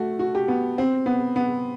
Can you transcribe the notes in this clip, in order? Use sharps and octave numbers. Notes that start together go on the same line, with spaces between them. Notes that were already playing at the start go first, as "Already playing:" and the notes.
Already playing: A3 F#4
F#4
G4
B3
C4
B3
B3